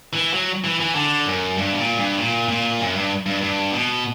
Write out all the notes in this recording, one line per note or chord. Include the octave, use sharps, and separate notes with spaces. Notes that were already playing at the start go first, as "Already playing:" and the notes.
E3
F#3
E3
E3
D3
F#2
G2
B2
A#2
G2
A#2
A#2
F#2
G2
G2
G2
B2